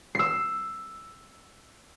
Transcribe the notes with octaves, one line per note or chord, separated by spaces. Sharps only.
E6 C7